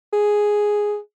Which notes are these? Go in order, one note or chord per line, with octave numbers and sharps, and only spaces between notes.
G#4